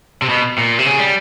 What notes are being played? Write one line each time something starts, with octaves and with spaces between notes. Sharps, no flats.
C3
B2
A#2
C3
C#3
G3